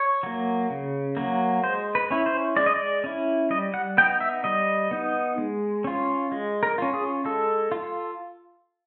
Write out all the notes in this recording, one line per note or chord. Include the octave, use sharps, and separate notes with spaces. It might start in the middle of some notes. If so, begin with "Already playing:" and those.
Already playing: C#5
F#3 A#3
C#3
F#3 A#3
G#3 C5
B4
C#4 E4
C5
G#3 D5
D#5
D5
C#4 E4
G3 D#5
F#5
B3 D#4 G5
E5
G3 D#5
B3 D#4
G#3
C#4 F4
G#3
A#4
C#4 F4
G#4
G#3 A4
F4